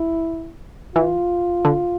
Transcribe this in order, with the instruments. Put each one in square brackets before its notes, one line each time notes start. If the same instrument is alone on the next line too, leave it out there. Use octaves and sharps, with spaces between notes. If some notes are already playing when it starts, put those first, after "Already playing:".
Already playing: [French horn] E4
[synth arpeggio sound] E3 [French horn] F4
[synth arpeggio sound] D3